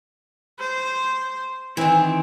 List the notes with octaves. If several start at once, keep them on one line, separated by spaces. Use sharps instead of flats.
C5
D#3 E3 C4